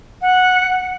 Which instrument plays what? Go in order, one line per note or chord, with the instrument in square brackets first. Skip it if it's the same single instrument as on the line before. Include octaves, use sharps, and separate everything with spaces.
[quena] F#5